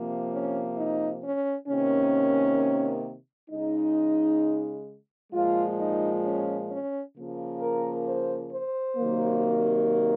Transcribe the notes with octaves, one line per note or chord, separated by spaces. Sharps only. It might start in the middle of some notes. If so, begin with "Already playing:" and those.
Already playing: C3 F3 A#3
C#4
D#4
C#4
C3 D#3 A#3 C#4
C#3 G#3 D#4
A#2 F3 G#3 F4
D#4
C#4
C#4
C#3 F3 A#3
A#4
C5
C5
C3 D#3 F#3 A#3